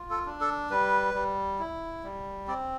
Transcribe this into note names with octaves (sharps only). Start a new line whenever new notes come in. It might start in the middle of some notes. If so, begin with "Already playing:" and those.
Already playing: F4
A4
D4
A4
G3 B4
G3
E4
G3
C4 D5